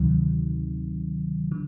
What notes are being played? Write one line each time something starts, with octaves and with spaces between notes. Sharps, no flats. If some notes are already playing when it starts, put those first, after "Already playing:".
Already playing: D2 C3 D#3 F#3
D3